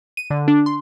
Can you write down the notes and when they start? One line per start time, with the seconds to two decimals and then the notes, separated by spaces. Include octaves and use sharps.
0.17 D#7
0.30 D3
0.48 D4
0.66 C6